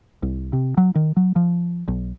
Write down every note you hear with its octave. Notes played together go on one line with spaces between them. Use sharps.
C2
C3
F#3
D#3
F#3
F3
B1